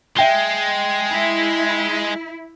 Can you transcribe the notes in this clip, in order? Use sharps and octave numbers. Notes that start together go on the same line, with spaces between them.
G#3 E5 G5 G7
E4